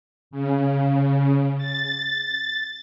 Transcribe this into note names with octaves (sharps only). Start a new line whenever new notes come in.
C#3
A6